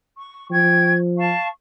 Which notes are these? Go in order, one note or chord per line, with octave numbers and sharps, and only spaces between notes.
C#6
F3 G5 C#6 G#6
F5 A5 C#6